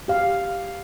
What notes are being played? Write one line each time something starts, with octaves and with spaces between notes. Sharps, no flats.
G4 F5